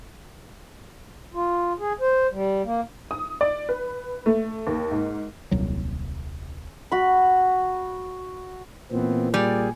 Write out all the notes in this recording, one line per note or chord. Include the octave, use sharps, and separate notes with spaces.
F4
G#4
C5
G3
A#3
D#6
D5
B4
A3
D#2
G#2
D#1 C2 F#3
F#4 B5
A#2 E3 B3 C4
G3 G#4 D5